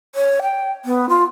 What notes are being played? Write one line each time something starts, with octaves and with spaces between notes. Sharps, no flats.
C#5
G5
B3
F4